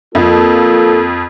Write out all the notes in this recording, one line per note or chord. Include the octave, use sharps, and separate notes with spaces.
F2 A#3 F4 A4